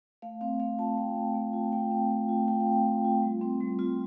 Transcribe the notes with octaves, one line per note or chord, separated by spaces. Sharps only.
A3 F5
C4 F5
A3 F5
F4 A5
A3 G5
C4
A3
F4
A3 G5
C4
A3
F4
A3 G5
F5
C4
G5
A3
F4
G3
C4
G3
F4